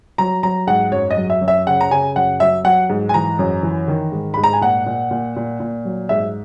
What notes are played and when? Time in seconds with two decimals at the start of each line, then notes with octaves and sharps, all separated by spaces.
0.18 F#3 A#5
0.43 F#3 A#5
0.67 G#2 F#5
0.92 F#2 C#5
1.11 D#5
1.17 F#3
1.30 E5
1.41 F#2
1.48 E5
1.67 C#3 F#5
1.81 A#5
1.91 C#3 G#5
2.16 F#2 F#5
2.40 F#3 E5
2.64 F#3 F#5
2.90 G#2
3.09 G#5
3.14 E3 A#5
3.39 F#2
3.63 E3
3.88 D#3
4.12 G#2
4.34 G#2 B5
4.44 A#5
4.53 G#5
4.61 A#2 F#5
4.86 A#2
5.11 A#2
5.36 A#2
5.60 A#2
5.85 F#3
6.09 G#2 E5